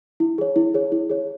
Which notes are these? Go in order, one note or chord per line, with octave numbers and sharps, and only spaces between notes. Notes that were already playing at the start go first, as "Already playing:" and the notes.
E4
G#4 C#5
E4
G#4 C#5
E4
G#4 C#5